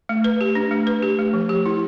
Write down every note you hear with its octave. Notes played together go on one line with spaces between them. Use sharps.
A3
B4
G4
D4
A3
B4
G4
A3
F3
G4
E4